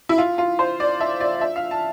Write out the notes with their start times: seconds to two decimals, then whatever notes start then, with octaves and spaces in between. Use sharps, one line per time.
0.09 E4
0.18 F4
0.38 F4
0.59 C5
0.80 D5
1.00 E5
1.20 D5
1.41 E5
1.56 F5
1.71 A5